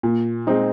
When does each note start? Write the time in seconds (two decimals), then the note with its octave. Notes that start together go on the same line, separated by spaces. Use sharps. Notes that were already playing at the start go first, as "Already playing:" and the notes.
0.03 A#2
0.47 G#3 C4 D#4